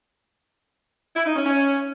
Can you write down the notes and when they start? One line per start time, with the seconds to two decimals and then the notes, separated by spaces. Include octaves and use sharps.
1.15 E4
1.26 D#4
1.36 C#4
1.46 C#4